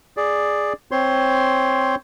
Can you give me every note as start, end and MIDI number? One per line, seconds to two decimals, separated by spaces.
0.17 0.73 68
0.17 0.73 74
0.91 1.95 60
0.91 1.95 72
0.91 1.95 73
0.91 1.95 84